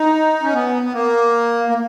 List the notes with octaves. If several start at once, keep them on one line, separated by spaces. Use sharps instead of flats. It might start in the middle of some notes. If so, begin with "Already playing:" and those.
Already playing: D#4
C#4
B3
B3
A#3
A#3